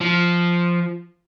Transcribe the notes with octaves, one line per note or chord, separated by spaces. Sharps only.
F3